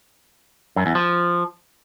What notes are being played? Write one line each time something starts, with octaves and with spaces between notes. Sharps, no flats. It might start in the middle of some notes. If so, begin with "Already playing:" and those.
F#2
E2
F3